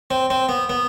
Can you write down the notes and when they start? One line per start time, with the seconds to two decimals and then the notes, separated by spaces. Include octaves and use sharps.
0.11 C4
0.30 C4
0.49 B3
0.69 B3